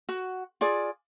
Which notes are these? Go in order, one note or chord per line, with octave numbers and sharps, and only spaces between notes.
F#4
F4 G#4 D5